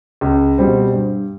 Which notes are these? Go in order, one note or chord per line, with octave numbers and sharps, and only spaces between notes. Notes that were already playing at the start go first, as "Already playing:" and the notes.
C#2
B2 G3 C4
G2